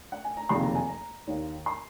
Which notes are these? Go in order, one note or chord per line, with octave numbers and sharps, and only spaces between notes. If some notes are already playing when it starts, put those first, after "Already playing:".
F#5
G#5
A#5
F#1 F2 C3 D#3 A#3 C6
A#5
G#5
A#5
D#2 D#3 A#3
C6